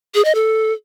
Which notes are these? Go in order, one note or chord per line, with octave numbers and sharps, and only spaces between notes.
G#4
D#5
A4